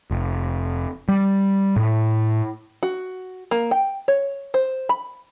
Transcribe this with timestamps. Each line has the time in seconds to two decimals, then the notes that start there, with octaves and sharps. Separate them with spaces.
0.11 F1
1.08 G3
1.76 A2
2.83 F#4
3.51 A#3
3.71 G5
4.08 C#5
4.54 C5
4.89 B5